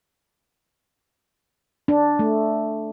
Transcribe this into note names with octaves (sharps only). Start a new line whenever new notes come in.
D4
A3